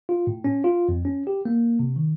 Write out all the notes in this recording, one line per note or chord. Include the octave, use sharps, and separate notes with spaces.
F4
A2
C#4
F4
F2
C#4
G4
A#3
C3
D#3